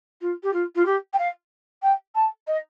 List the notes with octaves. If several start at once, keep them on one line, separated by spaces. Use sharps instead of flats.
F4
G4
F4
F4
G4
G5
F5
G5
A5
D#5